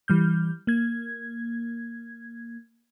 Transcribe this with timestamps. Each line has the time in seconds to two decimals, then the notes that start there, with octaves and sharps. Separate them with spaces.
0.08 E3 G3 F6 G6
0.67 A#3 G#6